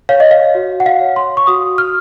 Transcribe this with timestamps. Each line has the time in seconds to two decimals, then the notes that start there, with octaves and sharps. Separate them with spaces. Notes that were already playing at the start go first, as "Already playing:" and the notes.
0.09 C#5 F5
0.20 D#5
0.31 F5
0.55 F#4
0.80 F#5
0.86 F5
1.01 C#5
1.16 C6
1.37 C#6
1.47 F#4 D#6
1.78 F6